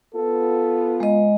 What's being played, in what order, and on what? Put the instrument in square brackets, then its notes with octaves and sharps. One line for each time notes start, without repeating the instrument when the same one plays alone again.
[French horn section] B3 F4 [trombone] A4
[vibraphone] G#3 D#5